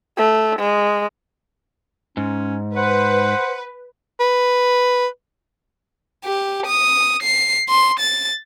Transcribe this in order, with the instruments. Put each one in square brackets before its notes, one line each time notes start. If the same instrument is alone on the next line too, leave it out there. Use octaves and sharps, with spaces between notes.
[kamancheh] A3
G#3
[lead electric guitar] G#2 [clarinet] C#4
[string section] B4 [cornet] C5 [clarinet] F#5
[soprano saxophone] B4
[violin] G4
D#6
C7
C6
A6